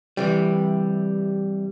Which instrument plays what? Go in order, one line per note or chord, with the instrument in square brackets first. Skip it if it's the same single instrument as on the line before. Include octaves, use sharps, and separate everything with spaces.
[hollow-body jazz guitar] C3 E3 G3